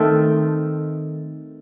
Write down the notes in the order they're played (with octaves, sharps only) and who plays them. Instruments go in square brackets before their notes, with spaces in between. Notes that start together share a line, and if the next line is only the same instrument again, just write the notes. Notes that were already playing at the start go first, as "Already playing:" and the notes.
Already playing: [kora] D#3 A3 C4 A4